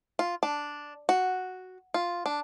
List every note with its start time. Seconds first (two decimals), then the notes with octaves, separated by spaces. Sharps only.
0.19 F4
0.43 D4
1.09 F#4
1.94 F4
2.26 D4